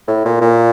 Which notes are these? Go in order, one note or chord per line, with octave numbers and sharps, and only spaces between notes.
A2
A#2
A#2